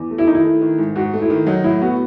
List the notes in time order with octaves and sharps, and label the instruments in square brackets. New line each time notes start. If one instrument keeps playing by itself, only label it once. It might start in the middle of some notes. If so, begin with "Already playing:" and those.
Already playing: [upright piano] E2
A3
[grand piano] E4
[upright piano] D#3 [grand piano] D#4
[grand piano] E4
[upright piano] A3
D#3
G#2
[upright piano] G#2 [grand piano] F#4
[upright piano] A3
[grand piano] E4
[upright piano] D#3
[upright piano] F#3 [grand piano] D#4
[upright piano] A2 [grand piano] E4
[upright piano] B3 [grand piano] F#4